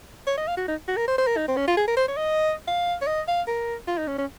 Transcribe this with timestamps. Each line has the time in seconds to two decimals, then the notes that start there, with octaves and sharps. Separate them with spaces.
0.27 C#5
0.38 D#5
0.48 F5
0.57 F#4
0.68 D#4
0.88 F#4
0.97 A#4
1.08 C5
1.18 C5
1.27 A#4
1.37 D#4
1.48 C4
1.57 C#4
1.68 F4
1.77 G#4
1.88 A#4
1.97 C5
2.08 C#5
2.17 D#5
2.67 F5
3.02 C#5
3.07 D#5
3.28 F5
3.47 A#4
3.88 F4
3.98 D#4
4.07 C#4
4.18 C#4